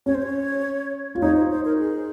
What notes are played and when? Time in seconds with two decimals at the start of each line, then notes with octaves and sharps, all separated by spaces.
0.06 C#4 C#5
0.15 C5
0.22 C#5
1.15 F4
1.22 D#4 C#5
1.36 C5
1.50 C5
1.65 A#4
1.76 F#4
1.79 G#4